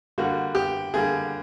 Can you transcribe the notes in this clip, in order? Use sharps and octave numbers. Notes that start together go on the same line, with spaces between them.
D3 G3 A#3 F#4
G4
D3 G3 A#3 G#4